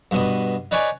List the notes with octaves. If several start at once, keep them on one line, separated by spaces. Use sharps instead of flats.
G2 B2 D#6
D#4 B4 C#5 D5 G#5